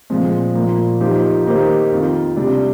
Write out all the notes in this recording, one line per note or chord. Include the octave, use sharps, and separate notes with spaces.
A#2 F3 G#3 C4
A#2 F3 A#3
F3 A#3 D#4 G4 C5
D#3 A#3 D#4 G4 C5
F2 D#3 A#3 F4
C3 G3 D4